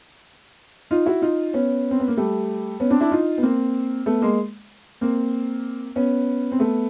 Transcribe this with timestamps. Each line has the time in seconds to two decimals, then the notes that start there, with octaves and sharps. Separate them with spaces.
0.91 D#4 F4
1.06 E4 F#4
1.22 D#4 F4
1.53 B3 C#4
1.91 C4
2.00 B3
2.08 A#3
2.17 G3 A3
2.80 B3 C#4
2.90 C4 D4
3.01 D4 E4
3.12 D#4 F4
3.38 B3
3.43 A#3 C4
4.06 A3 B3
4.22 G#3 A#3
5.01 A#3 C4
5.96 B3 C#4
6.52 C4
6.59 A3 B3